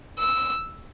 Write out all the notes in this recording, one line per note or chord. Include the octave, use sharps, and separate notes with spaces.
E6